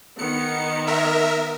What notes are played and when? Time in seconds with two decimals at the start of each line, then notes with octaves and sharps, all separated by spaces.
0.19 D#3 B3 C#7
0.87 A#4 E5